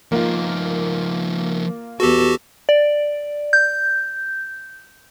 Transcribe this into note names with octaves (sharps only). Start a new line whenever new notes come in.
F3 A#3 D#4 F4
E2 B3 F#4 G4 A4
D5
G6